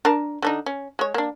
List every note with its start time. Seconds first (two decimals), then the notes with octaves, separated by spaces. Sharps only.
0.05 D4 A#4 A5
0.42 D3 D4 D#4
0.66 C#4
0.99 G#3 C#5
1.14 A#3 D4